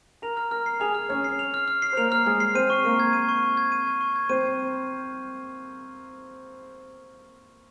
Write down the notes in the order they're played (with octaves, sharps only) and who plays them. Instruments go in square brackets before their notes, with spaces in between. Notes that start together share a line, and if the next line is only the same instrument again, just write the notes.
[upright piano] A#4 A#5 [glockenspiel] F7
[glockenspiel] F6
[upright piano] A#4 A#5 [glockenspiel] F6
[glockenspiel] C7
[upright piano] G#4 G#5 [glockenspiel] F7
[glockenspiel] F6
[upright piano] C#4 C#5 [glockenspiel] F6
[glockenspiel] C7
F7
F6
F6
C7
[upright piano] C5
[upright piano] A#3 A#4 [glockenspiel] F7
[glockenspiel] F6
[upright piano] G#3 G#4 [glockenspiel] F6
[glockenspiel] C7
[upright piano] C4 C5 [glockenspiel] D#7
[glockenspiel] C#6
[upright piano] A#3 A#4 [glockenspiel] C#6
[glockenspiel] G#6
D#7
C#6
C#6
G#6
D#7
C#6
C#6
G#6
[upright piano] C4 C5 [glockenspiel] D#7